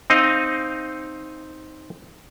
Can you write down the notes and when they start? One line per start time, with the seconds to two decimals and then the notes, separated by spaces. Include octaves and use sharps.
0.10 C4 D#4 D#5 F5